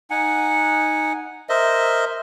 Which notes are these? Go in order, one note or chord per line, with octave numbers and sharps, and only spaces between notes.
D#4 F#5 G#5
A#4 C5 D#5 E5